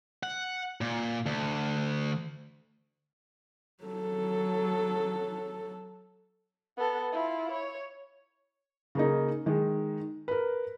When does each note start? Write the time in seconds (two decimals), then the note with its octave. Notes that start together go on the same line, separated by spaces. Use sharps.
0.23 F#5
0.81 A#2
1.26 D2
3.84 F#3 A4
6.77 B3 A4
7.12 E4 F4
7.52 C#5
8.95 C#3 A#3 D#4
9.46 D#3 G#3
10.28 A#4 B4